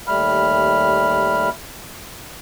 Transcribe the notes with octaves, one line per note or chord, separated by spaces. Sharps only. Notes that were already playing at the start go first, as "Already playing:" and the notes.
D#2 G3 A3 B5 F6